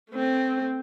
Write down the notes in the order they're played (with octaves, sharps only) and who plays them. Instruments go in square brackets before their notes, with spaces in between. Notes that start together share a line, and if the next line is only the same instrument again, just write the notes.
[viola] A3 C4